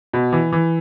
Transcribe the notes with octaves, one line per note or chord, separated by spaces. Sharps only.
B2
E3
E3